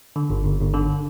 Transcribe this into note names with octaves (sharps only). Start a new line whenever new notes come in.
D3
G1
G1
G1
D3